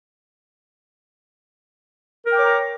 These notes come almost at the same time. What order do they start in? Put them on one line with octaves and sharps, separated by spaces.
A#4 G5 D6 C#5 A#5